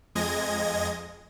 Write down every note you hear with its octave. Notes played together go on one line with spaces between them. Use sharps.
F2 G#3 D#5 G#6 A#6